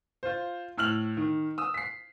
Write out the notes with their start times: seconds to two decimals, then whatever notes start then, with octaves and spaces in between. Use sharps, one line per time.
0.23 F4 C5
0.78 A2 E6 F6 F#7
1.17 D#3
1.58 D#6 E6
1.74 B6 C7